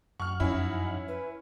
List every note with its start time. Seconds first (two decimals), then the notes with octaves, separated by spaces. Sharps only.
0.20 F#2 F#5 C#6 F6
0.40 F2 C#4 D#4 E4
1.08 B4